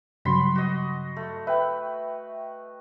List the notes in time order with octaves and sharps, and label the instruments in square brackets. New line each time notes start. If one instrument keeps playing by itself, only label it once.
[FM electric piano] G2 C#3 F#3 [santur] F#4 B5 C6
[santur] F#4 D#5
A3
[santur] B4 [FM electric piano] E5 G5